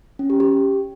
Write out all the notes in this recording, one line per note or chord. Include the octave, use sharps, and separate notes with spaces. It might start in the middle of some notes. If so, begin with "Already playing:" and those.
C#4
G4
G4